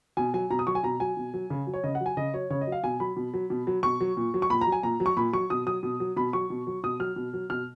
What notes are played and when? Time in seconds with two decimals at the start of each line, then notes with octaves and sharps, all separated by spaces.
0.17 B2 G#5
0.34 F#3 G#5
0.51 B2 A#5
0.59 D#6
0.67 F#3 C#6
0.75 G#5
0.83 B2 A#5
1.00 F#3 G#5
1.17 B2
1.34 F#3
1.50 C#3
1.67 F#3
1.74 C#5
1.84 C#3 D#5
1.95 F#5
2.00 F#3
2.06 G#5
2.17 C#3 D#5
2.34 F#3 C#5
2.50 C#3 C#5
2.61 D#5
2.67 F#3
2.72 F5
2.83 B2 G#5
3.00 F#3 B5
3.17 B2
3.34 F#3
3.50 B2
3.67 F#3
3.83 B2 C#6
4.00 F#3
4.17 A#2
4.34 F#3
4.42 C#6
4.50 A#2 B5
4.61 A#5
4.67 F#3
4.72 G#5
4.83 A#2 A#5
5.00 F#3
5.06 C#6
5.17 A#2 B5
5.33 F#3 C#6
5.50 B2 D#6
5.66 F#3 D#6
5.83 B2
6.00 F#3
6.17 B2 B5
6.33 F#3 C#6
6.50 B2
6.67 F#3
6.84 B2 D#6
7.00 F#3 F6
7.16 B2
7.33 F#3
7.50 B2 F6